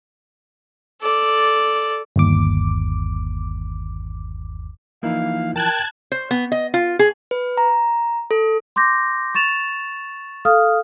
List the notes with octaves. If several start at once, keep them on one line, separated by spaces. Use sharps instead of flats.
A4 D5
G1 D#2 D6
E3 F3 A#3 D#4 E4 F5
A#4 G5 A5 F#6 G#6
C5
B3
D#5
F4
G#4
B4
A#5
A4
C6 D6 G6 A#6
C#6 A6 E7 F7
A4 F5 D#6 F6